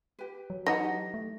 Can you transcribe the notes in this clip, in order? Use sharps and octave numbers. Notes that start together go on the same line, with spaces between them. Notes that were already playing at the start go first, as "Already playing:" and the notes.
G4 B4
F#3
E3 D#4 D#5 F#5 A5 A#6
G4
A3